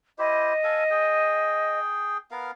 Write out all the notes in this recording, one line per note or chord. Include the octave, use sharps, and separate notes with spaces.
E4 G4 C5 D#5
A4 F5 G#5
G#4 G5
B3 A#4 F5